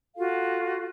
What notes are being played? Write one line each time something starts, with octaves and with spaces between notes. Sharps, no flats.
F4 F#4 A4 F5